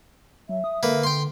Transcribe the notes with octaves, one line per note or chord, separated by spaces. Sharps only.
F#3 E5
D#6
D3 A#3 B4
G5 C6